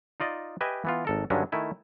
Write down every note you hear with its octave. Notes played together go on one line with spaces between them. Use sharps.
D#4 F4 D5 D#5
G4 B4 D#5 E5 G5 G#5
E3 B3 F4
G#1 A4 A#4
G2 D3 D#3 F#3 C#4 D4
D#3 A3 E4 G#5